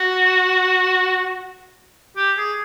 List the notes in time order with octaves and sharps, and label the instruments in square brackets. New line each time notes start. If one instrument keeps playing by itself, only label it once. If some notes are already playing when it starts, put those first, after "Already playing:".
Already playing: [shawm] F#4
G4
G#4